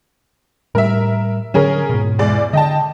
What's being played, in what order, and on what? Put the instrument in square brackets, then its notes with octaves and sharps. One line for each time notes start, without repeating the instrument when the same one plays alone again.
[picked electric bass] A2 G3 [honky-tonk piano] A#4 E5
[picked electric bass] D3 F#3 [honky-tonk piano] C#4 G#4 A#4
[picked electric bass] G#2 B2
[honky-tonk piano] E2 G#3 D5
[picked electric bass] D3 [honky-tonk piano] D#5 G5 A5